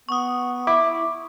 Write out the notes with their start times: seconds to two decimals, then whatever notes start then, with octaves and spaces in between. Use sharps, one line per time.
0.09 B3 C#6 D#6
0.67 E4 D6